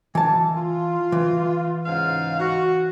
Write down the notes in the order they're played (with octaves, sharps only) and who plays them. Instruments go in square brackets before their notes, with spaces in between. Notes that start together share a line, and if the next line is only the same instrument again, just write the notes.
[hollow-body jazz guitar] E3 A5
[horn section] F4
[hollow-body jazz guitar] E3
[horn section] G#2 C#3 F5
F#4